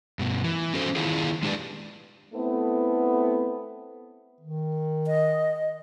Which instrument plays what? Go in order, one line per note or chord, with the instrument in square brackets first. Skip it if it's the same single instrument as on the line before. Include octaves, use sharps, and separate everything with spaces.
[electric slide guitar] G2 B2
E3
C#4 F#4 A4 C5
D#3 E4 F4 G#4
G#3 D4 G4 B4 D5
[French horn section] A3 B3 C4 E4 A4
[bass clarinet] D#3
[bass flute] D#5